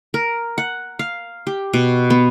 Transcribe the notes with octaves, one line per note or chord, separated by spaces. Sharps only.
A#4
F#5
F5
G4
B2
B3